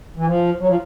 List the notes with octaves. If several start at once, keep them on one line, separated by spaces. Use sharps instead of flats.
E3
F3
F#3
F3